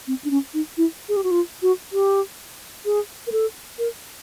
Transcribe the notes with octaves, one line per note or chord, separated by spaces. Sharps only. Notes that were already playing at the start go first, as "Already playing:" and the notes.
C4
D4
C#4
D#4
E4
G#4
G4
F#4
F4
F#4
G4
G#4
A#4
A4
A#4